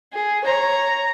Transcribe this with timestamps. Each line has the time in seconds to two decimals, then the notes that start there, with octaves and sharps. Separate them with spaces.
0.14 G#4
0.45 C#5 A#5